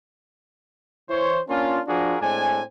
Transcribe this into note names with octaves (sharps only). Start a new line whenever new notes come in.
E3 C5 C#5
A#3 C#4 D4 F4
F3 D4 F4 F#4 G#4 A#4
A2 G#3 C4 D4 G#5